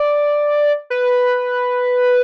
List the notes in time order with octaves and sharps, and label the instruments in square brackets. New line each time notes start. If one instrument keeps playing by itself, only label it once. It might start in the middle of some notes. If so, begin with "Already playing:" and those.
Already playing: [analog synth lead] D5
B4